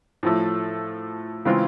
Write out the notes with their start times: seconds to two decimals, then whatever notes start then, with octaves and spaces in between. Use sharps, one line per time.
0.23 A2 F3 A3
1.45 C#3 E3 G#3 C4 F4